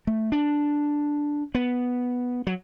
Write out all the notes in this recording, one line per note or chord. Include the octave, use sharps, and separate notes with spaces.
A3
D4
B3
F#3